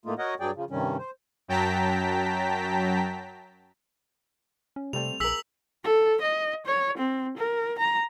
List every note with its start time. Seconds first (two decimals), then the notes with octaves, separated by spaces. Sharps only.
0.05 A2 A3 A#3 D#4 F4
0.19 F#4 A#4 C#5 D#5 F#5
0.40 G2 F#3 G#4 D5 G5
0.56 C#3 F3
0.71 G2 C3 D#3 G3 C#4
0.98 C5
1.48 F#2 F#3 G5 A5 A#5 B6
4.76 C#4
4.93 C3 G3 A3 C4 F7
5.20 A#1 G#4 A#4 E6 B6 F#7
5.84 A4
6.22 D#5
6.66 C#5
6.98 C4
7.37 A#4
7.79 A#5